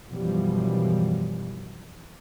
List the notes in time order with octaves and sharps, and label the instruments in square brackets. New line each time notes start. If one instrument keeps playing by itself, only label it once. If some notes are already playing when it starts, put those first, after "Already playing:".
[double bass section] F#2 B2 E3 F3 G3